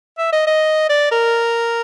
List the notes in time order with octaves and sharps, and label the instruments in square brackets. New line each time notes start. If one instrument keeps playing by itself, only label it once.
[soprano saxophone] E5
D#5
D#5
D5
A#4